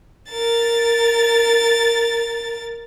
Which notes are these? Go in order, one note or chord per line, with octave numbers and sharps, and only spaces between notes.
A#4 A6